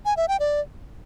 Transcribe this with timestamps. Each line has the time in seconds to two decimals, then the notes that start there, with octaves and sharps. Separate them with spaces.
0.05 G#5
0.17 E5
0.28 G5
0.40 D5